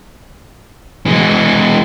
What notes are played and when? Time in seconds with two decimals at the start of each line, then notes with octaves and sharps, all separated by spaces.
1.06 E3 G#3